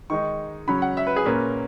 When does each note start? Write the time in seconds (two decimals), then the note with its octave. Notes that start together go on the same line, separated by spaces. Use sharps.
0.10 D#3 G#3 D#4 C#6
0.67 C#3 F#3 C#4 B5
0.82 F#5
0.97 E5
1.07 B4
1.16 G#4
1.25 A#2 A#3 C#4 B4